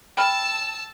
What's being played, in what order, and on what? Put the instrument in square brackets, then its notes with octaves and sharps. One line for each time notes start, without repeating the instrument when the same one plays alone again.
[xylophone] G5 B5 F6 [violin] A5 E6